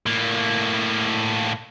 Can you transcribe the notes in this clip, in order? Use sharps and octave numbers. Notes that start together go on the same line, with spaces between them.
A2 A#3